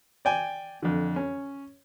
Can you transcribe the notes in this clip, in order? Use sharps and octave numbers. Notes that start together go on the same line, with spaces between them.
D5 G5 G#5
F2 D3
C#4